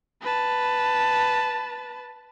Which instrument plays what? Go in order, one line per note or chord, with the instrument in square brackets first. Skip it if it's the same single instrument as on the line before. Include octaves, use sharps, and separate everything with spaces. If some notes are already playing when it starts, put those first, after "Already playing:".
[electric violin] B4 A5